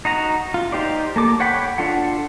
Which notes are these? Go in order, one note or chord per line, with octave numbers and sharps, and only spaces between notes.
D#4 F#4 A#5
F4
D#4 G4 C5 D5
A#3 A4 D6
C#5 F#5 G5 B5
D4 F4 A4 F#5